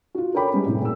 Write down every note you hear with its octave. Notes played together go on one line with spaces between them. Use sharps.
F4 F#4
A4 A#4 C#5 G5 B5 D6
G3 G#3 B3 C#4
A2 C3 E4
A#2 E6